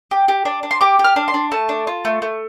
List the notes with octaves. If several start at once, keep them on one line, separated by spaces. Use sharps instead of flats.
G4
G4
D4
D4
C6
G4 D6
G4
F6
D4
C6
D4
A3 A5
D4
F4
A3
A3